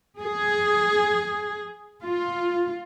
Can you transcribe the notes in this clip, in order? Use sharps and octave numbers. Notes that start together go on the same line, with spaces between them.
G#4
F4